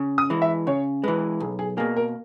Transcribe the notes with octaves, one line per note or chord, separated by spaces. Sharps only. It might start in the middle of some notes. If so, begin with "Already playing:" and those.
Already playing: C#3
D#6
E3 G#3
E5
C#3 C#5
E3 G#3 B4
B1 G#4
G#4
B2 A#3 G#4
A#4